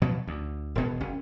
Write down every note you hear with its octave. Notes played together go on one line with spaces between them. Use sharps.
B2 F3 F#3
D2
E1 B2 B3
F#1 C#4